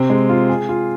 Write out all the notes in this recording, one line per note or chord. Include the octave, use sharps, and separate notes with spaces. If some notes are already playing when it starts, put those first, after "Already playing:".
Already playing: C3 C4
G#3
F4
G#4
F4